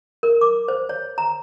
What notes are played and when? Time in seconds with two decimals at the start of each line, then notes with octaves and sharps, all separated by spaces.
0.23 A#4
0.41 D6
0.68 C5
0.89 C#5
1.18 A#5